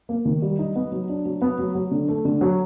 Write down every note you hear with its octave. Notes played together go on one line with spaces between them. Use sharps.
A#3
D#3
G3
D#4
B3
F#3
D4
F#3
B3
F#3
F#3
D3
A3
D3
F#3